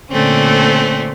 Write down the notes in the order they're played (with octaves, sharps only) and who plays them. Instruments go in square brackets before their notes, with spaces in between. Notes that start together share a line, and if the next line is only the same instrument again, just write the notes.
[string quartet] A#2 D3 A3 C4 C#4